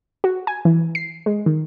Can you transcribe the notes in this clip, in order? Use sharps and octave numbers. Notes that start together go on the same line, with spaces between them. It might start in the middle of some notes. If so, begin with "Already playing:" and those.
F#4
G#5
E3
C7
G#3
D#3